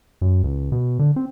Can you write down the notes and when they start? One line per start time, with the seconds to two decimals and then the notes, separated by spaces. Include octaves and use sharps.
0.21 F#2
0.44 C#2
0.72 B2
0.99 D3
1.16 C4